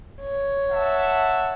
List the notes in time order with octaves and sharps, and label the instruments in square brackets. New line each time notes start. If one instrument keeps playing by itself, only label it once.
[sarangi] C#5
[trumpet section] E5 F#5 A5